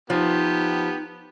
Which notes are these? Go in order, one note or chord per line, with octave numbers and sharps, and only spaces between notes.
F3 B3 D#4 G4